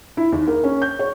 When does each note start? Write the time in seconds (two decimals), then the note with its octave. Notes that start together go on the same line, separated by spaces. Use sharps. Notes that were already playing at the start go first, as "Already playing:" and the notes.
0.17 E4
0.32 D#2
0.47 A#3
0.64 C#4
0.82 G6
0.99 C#5